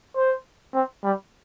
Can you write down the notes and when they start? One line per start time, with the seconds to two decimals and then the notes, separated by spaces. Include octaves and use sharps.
0.16 C5
0.74 C4
1.03 G3